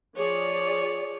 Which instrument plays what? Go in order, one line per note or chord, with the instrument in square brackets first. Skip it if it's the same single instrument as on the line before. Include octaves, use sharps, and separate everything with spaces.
[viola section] F3 G#4 D5 [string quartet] C#5